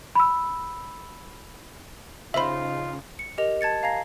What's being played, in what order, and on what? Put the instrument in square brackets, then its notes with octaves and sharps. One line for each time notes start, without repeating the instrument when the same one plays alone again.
[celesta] B5 E6
[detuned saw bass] C#3 [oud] D#4 C5 [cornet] F4 [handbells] E5 B5
[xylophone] C#7
G4 A#4 D#5 F7
A5 G#6 A6 C#7
F5 G#5 A#5 G#6 A#6 C7